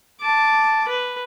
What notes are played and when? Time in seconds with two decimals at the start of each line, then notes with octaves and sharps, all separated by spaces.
0.21 A5 D6
0.88 B4